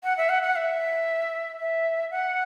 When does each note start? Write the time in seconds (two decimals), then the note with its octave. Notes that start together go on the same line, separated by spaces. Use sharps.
0.04 F#5
0.18 E5
0.29 F#5
0.43 F#5
0.56 E5
1.59 E5
2.11 F#5